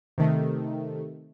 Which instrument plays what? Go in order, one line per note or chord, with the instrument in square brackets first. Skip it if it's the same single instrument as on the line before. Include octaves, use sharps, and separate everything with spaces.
[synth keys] C3 D#3 A3